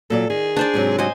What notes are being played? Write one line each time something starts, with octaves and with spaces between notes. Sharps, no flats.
A#2 F#3 A4 D5
D#3 G#4
D4 C5 D5
G#2 C3 F#3
F#4 C5 D#5 G#5